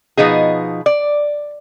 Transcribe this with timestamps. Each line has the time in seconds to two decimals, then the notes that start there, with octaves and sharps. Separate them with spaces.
0.17 B2 F3 B3 D#4 G#4
0.86 D5